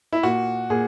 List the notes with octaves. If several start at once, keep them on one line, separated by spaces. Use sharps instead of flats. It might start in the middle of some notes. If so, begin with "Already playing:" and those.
E4
A#2 F#4
A#2 G#4